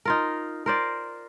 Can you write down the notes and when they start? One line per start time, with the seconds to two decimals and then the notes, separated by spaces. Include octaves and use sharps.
0.05 D#4 F4 A#4
0.66 A#4 C5 D5